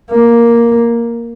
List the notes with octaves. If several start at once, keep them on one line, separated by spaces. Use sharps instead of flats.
A#3